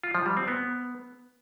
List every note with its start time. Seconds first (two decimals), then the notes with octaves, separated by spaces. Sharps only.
0.04 F4
0.15 F3
0.26 G3
0.37 C4
0.48 B3